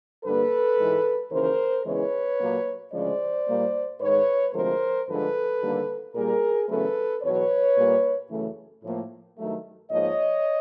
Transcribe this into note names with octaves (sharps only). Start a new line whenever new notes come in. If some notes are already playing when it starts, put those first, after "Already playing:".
G2 D3 G3 A#3 A4 B4
G#2 E3 G#3
D#2 C#3 E3 A#4 C5
E2 C#3 E3 G#3 B4 C#5
A#2 F#3 A#3
D2 C#3 F3 G#3 C5 D5
A#2 G3 A#3
G#2 D#3 G#3 B4 C#5
D2 C3 F3 G#3 A#4 C5
G2 D3 F3 G#3 A4 B4
D#2 D3 G3 A#3
A#2 G3 A#3 G#4 A#4
E2 C#3 F#3 A3 A4 B4
E2 B2 F#3 B4 C#5
A#2 G3 A#3
F#2 C#3 E3 A3
A2 F3 A#3
G2 D#3 F#3 A3
G#2 F3 A#3 C#5 D#5